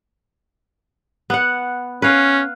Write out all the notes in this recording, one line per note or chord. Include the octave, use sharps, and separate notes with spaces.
B3 F#5
C#4 B4 F5